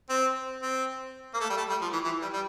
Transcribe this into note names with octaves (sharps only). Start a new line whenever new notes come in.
C4
C4
A#3
A3
G3
A3
G3
F3
E3
E3
G3
G3